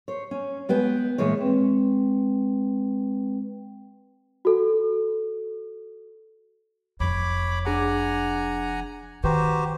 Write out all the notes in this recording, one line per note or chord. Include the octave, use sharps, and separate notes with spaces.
C5 C#5
C#4
G#3 B3 B4 G5
A#2 E3 G#3 C#5
G#3 C4 B4 G5
F#4 A4
F1 F2 C#5 B5 D6
D4 G#4 F#5 G#5 A#5 D6
D#3 F#4 G4 B4 C5 A#5